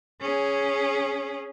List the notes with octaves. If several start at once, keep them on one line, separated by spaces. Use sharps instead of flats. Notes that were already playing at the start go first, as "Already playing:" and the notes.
C#4 G#4